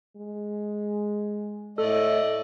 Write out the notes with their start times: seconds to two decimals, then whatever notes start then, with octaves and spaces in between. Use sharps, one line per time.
0.16 G#3
1.78 A2 A3 A4 D5 D#5